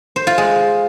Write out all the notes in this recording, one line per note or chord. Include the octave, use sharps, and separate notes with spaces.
C5
F4
G#3